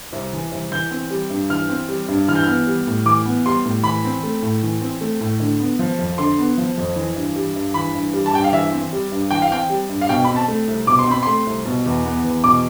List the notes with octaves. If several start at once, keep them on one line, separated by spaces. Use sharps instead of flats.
C2
E3
C2
E3 G6
C4
G3
G2
E3 F6
C4
G3
G2
E3 F6
G6
B3 F6
G3
A2
E3 D6
B3
G3 C6
A2
E3 B5
C4
A3
A2
E3
C4
A3
A2
D3
B3
F3
F2
D3 C6
B3
F3
F2
E3
G2
G3
G2
E3 B5
G2
G3
A5
G2 G5
F5
E3 E5
C4
G3
G2
E3 G5
F5
C4 G5
G3
G2
F5
B2 G5
C4 B5
A5
A3
C2
B2 D6
C6
C4 B5
A3 C6
C2
B2
E2
B3
E2
B2 D6